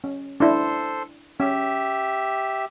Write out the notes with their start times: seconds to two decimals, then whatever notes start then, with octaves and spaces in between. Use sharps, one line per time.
0.04 C#4
0.40 D4 E4 A4 C5 C6
1.40 C#4 G4 E5